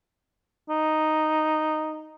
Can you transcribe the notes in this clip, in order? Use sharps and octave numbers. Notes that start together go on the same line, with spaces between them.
D#4